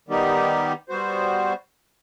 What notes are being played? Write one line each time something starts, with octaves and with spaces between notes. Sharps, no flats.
D#3 G3 B3 D#4 G4
G3 B3 F#4 C5